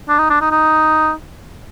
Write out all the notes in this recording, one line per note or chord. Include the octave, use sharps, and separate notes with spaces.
D4
D#4
D4
D#4
D#4